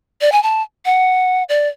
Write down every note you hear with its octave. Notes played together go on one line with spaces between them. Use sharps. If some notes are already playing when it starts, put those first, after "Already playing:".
D5
G#5
A5
F#5
D5